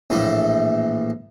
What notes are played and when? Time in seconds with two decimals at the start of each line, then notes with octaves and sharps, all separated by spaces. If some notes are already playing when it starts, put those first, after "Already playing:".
0.10 A#1 A2 E3 A3